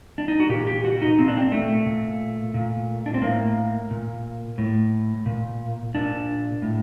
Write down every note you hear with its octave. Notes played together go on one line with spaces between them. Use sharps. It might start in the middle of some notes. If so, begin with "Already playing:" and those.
D4
D#4
F#4
A#2 G4
G4
F#4
D#4
A#2 C4
D4
C4
A3
A#2
A#2
D4
C4
A2 A#3
A#2
A2
A#2
A#2 D4
A2